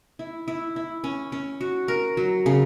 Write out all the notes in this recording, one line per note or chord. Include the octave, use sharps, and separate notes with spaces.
E4
E4
E4
C#4
C#4
F#4
A#4
F#3
C#3